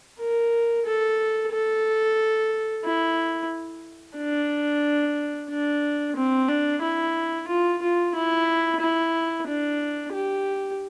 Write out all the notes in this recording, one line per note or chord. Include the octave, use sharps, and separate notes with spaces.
A#4
A4
A4
E4
D4
D4
C4
D4
E4
F4
F4
E4
E4
D4
G4